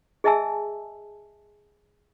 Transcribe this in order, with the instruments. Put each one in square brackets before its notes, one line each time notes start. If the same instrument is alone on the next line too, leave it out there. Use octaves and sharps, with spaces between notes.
[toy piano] G#4 D#5 E5 G#5 A5 E6